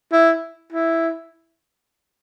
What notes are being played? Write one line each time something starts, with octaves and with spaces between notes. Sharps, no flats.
E4
E4